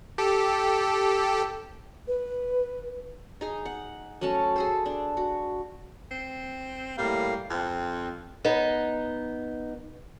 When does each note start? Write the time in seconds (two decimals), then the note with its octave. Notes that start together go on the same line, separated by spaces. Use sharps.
0.18 G4 A4
2.07 B4
3.41 D#4 G#4
3.66 F#5
4.21 F#3 A3 C#4 A5
4.56 G#4 A4 C5
4.86 D4
5.17 F#4
6.11 C4
6.98 A2 G3 A#3 F5
7.50 F2 C4
8.45 B3 D#4